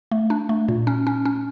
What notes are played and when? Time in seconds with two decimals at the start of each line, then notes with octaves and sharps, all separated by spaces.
0.11 A3
0.30 D4
0.49 A3
0.68 A#2
0.87 C#4
1.07 C#4
1.25 C#4